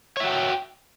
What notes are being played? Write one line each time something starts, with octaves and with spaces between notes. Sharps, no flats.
F#4 C#5 E5 G5